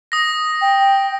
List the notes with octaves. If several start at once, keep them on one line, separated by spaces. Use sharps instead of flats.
D#6 A#6
G5